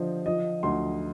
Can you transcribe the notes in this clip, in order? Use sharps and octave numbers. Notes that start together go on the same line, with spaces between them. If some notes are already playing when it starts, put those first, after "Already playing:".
Already playing: D3 F3 C5 D#5
F3 D#5
D2 C6